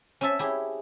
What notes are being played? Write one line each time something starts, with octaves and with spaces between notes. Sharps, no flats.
C#4 C5 C#5 E5 A5
E4 G4 G#4